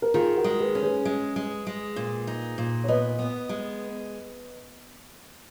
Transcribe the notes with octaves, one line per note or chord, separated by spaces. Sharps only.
A#4
D#3 F4 G#4
F#4 A#4
G#3
G#4 B4
C#4
G#4 B4
G#3
G#3
G#3
A#2
D#4
A#2
C#5
B3 B4 D#5
B3
G#3